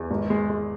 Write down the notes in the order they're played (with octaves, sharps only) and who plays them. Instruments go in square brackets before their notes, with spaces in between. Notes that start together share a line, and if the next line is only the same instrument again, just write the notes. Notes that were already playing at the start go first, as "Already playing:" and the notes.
Already playing: [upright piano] E2
G#1
G#3
G#3